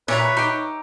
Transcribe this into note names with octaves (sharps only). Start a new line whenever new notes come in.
A#2 G#4 B4 C#5 E5 A#5
D#4 G4